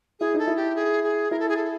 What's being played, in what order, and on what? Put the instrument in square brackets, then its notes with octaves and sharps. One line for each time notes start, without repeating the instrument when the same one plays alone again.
[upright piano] E4 [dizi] G#4
[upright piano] D#4 [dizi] A4
[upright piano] E4
[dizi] G4
G#4
G#4
[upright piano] E4 [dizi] A#4
[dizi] A4
G#4
A4